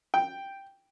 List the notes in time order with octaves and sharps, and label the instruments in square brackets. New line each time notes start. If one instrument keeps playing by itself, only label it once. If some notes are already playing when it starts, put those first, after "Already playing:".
[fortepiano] G5